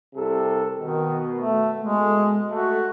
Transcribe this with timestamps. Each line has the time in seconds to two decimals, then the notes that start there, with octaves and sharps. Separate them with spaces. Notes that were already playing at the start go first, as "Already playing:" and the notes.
0.14 C2 C3 A4
0.79 B2 D#3
1.39 A3
1.80 B2 G#3 A3
2.49 A3 F#4